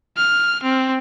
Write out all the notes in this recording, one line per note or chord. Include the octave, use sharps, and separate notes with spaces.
F6
C4